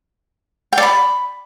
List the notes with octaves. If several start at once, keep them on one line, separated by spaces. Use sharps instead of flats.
G5
D5
B5